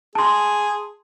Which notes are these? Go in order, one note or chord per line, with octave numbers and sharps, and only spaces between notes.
G#4 A5 C6